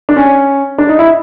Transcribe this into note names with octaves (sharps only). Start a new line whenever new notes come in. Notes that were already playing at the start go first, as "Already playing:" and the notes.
D4
C#4
D4
D#4
E4